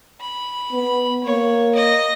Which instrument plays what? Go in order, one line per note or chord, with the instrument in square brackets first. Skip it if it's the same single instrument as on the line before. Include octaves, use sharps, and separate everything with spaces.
[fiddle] B5
[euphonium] B3
[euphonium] A#3 [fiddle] C#5
[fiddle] D#5